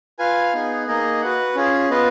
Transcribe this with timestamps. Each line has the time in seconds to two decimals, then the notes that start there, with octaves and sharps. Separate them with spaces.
0.19 F4 B4 F5 G#5
0.54 B3 D#4 G#4
0.87 A#3 D#4 G#4 D#5
1.22 F#4 B4 F#5
1.55 C#4 F4 G#4
1.90 B3 F4 B4 D#5